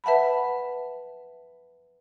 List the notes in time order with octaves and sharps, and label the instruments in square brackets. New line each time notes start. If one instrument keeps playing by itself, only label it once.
[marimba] B4 E5 F#5 A5 B5